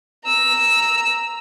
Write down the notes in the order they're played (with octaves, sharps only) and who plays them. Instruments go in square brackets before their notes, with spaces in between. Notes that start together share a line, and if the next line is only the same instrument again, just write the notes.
[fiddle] A#5 E6